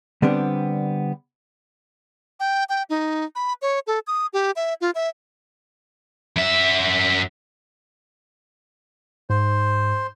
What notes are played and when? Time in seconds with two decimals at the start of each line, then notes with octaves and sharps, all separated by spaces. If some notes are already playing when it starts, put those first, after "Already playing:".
0.22 D3 G3 B3 C4 D4
2.40 G5
2.69 G5
2.90 D#4
3.35 B5
3.62 C#5
3.87 A4
4.07 D#6
4.33 G4
4.56 E5
4.81 F4
4.95 E5
6.36 F#2 E5
9.30 G#2 C5